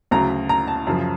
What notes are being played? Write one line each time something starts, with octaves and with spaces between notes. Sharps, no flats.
D2 C#3 F#3 A#5
A#5
A5
F#2 C#3 F3